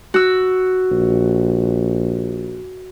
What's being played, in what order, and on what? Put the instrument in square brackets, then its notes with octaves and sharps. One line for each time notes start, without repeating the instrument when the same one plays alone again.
[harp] F#4 E6
[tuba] A#1